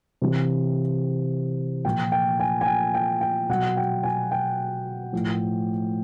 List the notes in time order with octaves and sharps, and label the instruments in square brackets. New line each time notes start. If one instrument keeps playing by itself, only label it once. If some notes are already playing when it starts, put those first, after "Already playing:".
[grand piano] C3 E3
A#2 F3 G5
G5
G#5
G#5
G5
G5
G5
B2 F#3 F#5
G5
G#5
G5
A2 F3